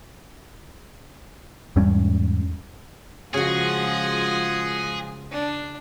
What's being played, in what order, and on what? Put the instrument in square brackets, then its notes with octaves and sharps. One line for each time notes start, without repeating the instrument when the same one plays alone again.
[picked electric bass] E2 G#2 G3 C#4
[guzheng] C#3 F#4 [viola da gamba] F3 G#3 F4 [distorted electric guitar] G#4 [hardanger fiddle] D#5 F#5
[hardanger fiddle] D4